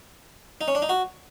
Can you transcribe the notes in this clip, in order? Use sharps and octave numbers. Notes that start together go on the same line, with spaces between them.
D#4
C#4
D4
D#4
F#4